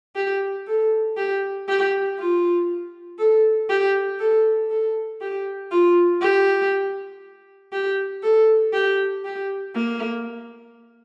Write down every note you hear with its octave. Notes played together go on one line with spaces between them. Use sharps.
G4
A4
G4
G4
F4
A4
G4
A4
A4
G4
F4
G4
G4
A4
G4
G4
A#3